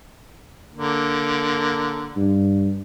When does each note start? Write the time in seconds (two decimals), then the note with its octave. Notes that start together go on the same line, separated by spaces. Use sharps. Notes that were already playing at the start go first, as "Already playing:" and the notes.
0.74 D3 A#3
2.17 G2